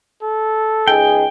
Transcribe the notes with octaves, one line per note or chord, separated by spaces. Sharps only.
A4
C#2 D#4 G#4 G5